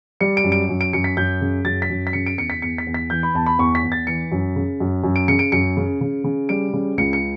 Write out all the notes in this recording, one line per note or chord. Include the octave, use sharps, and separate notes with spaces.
G3 C#7
D7
F#2
D7
F#2
D7
F#2 C#7
B6
F#2 G6
C#3
F#2 A6
B6
F#2
B6
C#3 C#7
D7
E2 C#7
B6
E2 C#7
B6
E2
B6
E3 G6
B5
E2 A5
B5
E2 C#6
B6
E2
A6
E3 C#7
F#2
C#3
F#2
F#2
D7
C#3 C#7
D7
F#2 C#7
C#3
C#3
C#3
G3 D7
C#3
C#2 C#7
C#7